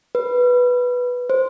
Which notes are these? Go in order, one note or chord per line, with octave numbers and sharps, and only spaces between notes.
B4
C5